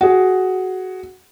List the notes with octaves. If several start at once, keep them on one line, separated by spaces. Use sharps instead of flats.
F#4 G#4